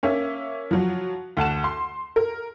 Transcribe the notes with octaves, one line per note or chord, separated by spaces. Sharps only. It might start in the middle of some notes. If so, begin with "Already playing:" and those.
A#3 C#4 E5
F3 F#3
D2 F#5 A5 E7
C6
A#4